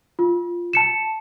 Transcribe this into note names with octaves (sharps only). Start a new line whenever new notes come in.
F4
A5 C#7 E7